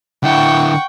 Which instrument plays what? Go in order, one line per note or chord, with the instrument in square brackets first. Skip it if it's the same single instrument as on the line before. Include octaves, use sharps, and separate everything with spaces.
[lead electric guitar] D3 E4 [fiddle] F#5 C#6 [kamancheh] G5